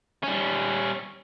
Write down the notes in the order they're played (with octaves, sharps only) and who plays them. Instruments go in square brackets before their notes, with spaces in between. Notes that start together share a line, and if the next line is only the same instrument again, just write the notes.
[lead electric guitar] G3 C#4